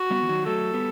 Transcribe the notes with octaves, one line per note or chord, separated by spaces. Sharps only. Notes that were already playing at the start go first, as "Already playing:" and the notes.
Already playing: F#4
G3 B3
E3
D#3 F#3
F#3 A3 A4
G3 B3